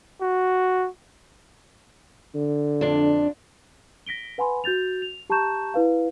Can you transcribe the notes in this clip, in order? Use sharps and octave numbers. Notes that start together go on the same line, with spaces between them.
F#4
D3
F2 D4
A#6 B6 D7 G7
B4 F#5 G#5 B5 C6
F#4 G6 A6 F7
F7
G4 A5 A#5 C#6 G6 E7
E4 B4 F5